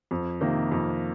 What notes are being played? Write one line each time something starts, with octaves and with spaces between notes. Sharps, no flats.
F2
C3 D#3 A#3
F2